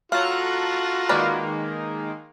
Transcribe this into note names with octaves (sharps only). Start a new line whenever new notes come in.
F#3 F4 F#4 A4 F5 A#5 F#6
D#3 G#3 A#3 A#4 B4 D5